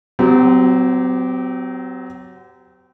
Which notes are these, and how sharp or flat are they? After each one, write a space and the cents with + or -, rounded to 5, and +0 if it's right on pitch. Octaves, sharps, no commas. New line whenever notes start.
F#3 +5 C4 -40 G4 +0